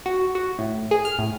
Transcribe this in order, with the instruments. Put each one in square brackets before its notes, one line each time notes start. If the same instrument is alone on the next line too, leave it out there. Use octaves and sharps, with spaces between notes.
[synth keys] F#4
F#4
A2
G#4
F6
A2